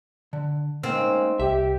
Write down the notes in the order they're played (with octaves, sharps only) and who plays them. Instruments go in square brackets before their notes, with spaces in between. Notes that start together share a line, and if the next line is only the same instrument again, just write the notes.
[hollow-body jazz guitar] D3
[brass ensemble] C#3 G#3 D#4 [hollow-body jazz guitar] A#3 [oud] C4
[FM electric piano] C2 [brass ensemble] G4 [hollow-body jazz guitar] E5